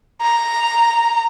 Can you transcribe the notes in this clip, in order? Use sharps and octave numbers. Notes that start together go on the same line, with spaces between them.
A#5